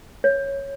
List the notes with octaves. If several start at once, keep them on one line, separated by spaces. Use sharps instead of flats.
C#5